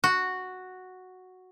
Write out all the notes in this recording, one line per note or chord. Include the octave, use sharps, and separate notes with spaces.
F#4